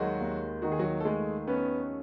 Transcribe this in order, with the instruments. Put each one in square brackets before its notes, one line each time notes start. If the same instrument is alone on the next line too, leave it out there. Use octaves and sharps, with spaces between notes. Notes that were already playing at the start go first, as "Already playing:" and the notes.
Already playing: [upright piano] D#2 D#3 G#3 [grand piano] F#3 F#4
[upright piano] D#2
[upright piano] D#3 [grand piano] F#4
[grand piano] G#4
F#3 F#4
A4
[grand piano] G#3 G#4 [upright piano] A3
[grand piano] B3 B4 [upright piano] C#4